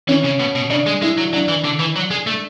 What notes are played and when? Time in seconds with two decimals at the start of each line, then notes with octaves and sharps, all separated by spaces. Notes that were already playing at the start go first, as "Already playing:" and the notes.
0.08 E3 C#4
0.24 C#3
0.39 B2
0.55 B2
0.70 C#3 D4
0.86 G#3
1.02 G#3 E4
1.18 F#3
1.33 F#3 D4
1.49 E3
1.65 D3
1.80 E3
1.96 F#3
2.11 G#3
2.27 A3